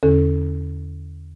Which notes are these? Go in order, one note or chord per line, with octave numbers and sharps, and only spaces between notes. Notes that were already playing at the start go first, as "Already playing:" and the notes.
E2 D3 C#4 A4